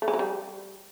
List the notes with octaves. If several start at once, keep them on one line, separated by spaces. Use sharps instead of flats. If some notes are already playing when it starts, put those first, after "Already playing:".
A3
G#3
F#3
G3